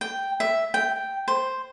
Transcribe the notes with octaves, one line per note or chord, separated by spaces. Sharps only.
G5
E5
G5
C5